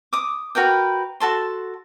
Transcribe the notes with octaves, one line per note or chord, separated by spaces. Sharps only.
D6 D#6
F#4 A#4 B4 G5
F#4 A4 A5 C6